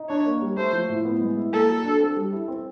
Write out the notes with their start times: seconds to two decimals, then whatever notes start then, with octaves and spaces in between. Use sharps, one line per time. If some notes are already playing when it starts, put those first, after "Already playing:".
Already playing: D#4
0.09 D4 C#5
0.26 A#3
0.42 G3
0.57 A3 C5
0.73 F3
0.89 A2
1.05 B3
1.21 G#3
1.36 E4
1.52 A#3 A4
1.68 F#3
1.84 D4
2.00 C4
2.16 G3
2.32 E4
2.48 C4